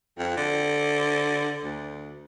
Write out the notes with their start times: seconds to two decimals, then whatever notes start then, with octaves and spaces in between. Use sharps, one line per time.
0.18 F2
0.37 D3
1.64 D2